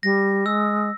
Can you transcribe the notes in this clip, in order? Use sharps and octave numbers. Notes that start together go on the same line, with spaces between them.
G3 A#6
G#3 E6